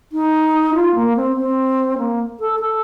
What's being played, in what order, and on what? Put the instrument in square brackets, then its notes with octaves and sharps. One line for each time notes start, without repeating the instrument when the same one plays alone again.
[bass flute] D#4
F4
A#3
C4
C4
A#3
A4
A4